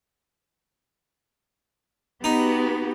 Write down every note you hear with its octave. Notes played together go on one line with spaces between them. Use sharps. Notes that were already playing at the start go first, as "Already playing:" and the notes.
B3 D#4 F#4 G4